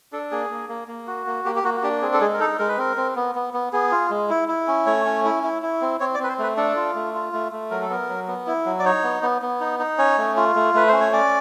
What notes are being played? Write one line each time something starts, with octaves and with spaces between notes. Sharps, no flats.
D4 A4
A#3 G#4
A#3
A#3
A#3
F#4
A#3
A#3 G4
G4
A#3 F#4
F#4
D4 G4
C4 G#4
A4
G#3 G#4
A#4
D#4 A4
G#3 A#4
B4
C4 A#4
C4
B3
B3
B3
B3 G#4
F4
G#3
E4
E4
C#4
A3 C#5
C#4
E4
E4
E4
C4
C4 C#5
D5
C4 B4
C5
A3 B4
D4 A4
F4
A3
F4
A3
A3
F#3 A#4
A4
B3 A#4
F#3
B3
E4
F#3
D5
D#4 C#5
B3
B3
B3
D#4
D#4
C#4 C#5
A3
F4
A3
A3 B4
C#4 C5
C#5
C#4 D5